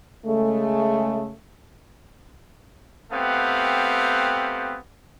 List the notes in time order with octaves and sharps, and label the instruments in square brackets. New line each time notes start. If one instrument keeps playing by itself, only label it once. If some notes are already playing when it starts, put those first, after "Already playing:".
[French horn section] C#3 G#3 A3
[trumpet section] A3 B3 C4 G4 F5 F#5